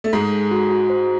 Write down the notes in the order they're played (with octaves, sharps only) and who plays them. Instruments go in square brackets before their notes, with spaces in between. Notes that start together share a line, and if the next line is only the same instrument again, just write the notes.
[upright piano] A3
[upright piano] G#2 G#3 [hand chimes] A4
[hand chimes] A4
F#4
F#4
C5